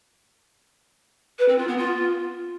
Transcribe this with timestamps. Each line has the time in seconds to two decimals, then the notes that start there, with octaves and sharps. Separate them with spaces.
1.38 B4
1.48 C4
1.58 F4
1.67 B3
1.77 F4